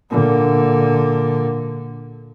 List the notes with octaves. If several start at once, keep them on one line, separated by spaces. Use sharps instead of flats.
A#2 D3